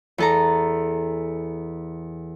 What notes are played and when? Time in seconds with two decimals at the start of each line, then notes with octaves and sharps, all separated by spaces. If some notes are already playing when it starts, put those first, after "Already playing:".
0.18 E2 A4 A#5